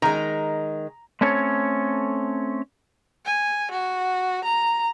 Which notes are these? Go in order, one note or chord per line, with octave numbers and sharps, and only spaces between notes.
D#3 G#3 A#5
A3 C4 C#4 A4 C#5
G#5
F#4
A#5